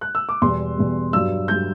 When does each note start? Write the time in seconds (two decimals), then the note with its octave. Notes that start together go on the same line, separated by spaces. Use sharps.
0.01 F#6
0.15 E6
0.29 D6
0.42 E2 B2 G3 C6
0.78 E2 B2 G3
1.13 G2 F#3 E6
1.48 G2 F#3 G6